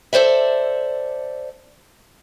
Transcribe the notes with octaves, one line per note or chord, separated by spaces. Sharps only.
A4 C5 D5 E5